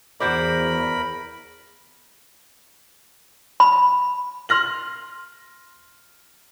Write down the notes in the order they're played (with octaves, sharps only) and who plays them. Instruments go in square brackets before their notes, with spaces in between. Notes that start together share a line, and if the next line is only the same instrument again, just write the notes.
[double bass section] E2 [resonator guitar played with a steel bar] F#4 C5 D5 [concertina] A#4 B5
[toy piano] B5
[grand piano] C6 F6 A#6 F#7